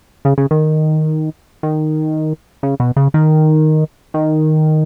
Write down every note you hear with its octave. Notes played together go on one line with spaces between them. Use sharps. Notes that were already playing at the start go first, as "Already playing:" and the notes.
C#3
C#3
D#3
D#3
C#3
B2
C#3
D#3
D#3